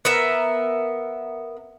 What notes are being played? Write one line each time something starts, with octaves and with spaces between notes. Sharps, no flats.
B3 A#4 E5